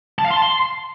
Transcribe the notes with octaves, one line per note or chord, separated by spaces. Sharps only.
A5
F5
C6
A5
C6